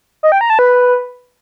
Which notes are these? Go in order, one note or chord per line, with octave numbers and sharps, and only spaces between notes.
D#5
G5
A#5
A5
B4